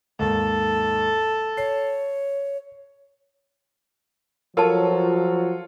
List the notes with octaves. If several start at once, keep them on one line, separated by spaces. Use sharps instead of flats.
D#2 G#2 A4
C#5 C7
F3 F#3 F4 A4 A#4 C#5 A5